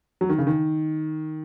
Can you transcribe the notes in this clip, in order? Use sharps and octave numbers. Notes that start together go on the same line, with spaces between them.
F#3
D#3
C#3
D#3